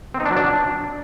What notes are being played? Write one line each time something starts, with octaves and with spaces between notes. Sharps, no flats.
C4
D#4
D4
F#3
D4